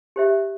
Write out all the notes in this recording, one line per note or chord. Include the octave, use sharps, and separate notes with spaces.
G4 C5 E5